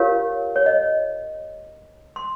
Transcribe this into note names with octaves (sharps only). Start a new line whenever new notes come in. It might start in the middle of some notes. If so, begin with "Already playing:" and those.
Already playing: F4 G4 A#4 C#5 F5
C#5
D#5
C6